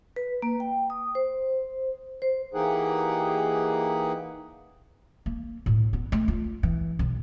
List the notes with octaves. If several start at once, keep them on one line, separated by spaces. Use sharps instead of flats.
B4
A#3
G5
D#6
C5
C5
E3 A#3 D#4 G4 G#4 F#5
A#3
A2
B3
A3
F4
E3
B1